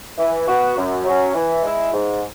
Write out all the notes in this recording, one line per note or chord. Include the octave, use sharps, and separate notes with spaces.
E3
B3 F#4
F#2
F#3 C#4
E3
G#3 E4
G#2